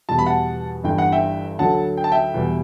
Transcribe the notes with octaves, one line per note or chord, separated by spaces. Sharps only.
E2 B2 G3 A5
B5
F#5 A5
G1 G2 E3 G3 G5
F#5
E5 G5
D2 D3 F#3 F#5 A5
G5
A5
E5 G5
E2 B2 G3